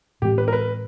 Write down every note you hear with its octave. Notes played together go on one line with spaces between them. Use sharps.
A2 E3 G#3 C4 G4
B4
A#4
B4